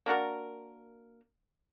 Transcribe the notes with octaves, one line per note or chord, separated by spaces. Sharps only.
A#3 D4 F#4 A#4